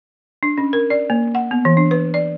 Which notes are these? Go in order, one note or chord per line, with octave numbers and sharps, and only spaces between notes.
D4
C#4
A#4
D5
A#3
F#5
B3
E3
D4
B4
D5